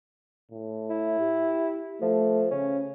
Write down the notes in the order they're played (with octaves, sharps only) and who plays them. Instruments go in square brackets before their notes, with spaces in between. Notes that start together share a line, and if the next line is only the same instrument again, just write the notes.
[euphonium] A2
[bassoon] E4
[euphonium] G4
[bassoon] F3 [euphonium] A3
[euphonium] C#3 [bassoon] C#4